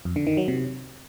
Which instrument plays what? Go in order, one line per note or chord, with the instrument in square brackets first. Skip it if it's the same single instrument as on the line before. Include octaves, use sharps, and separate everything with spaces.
[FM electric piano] F2
D3
D#3
F#3
C3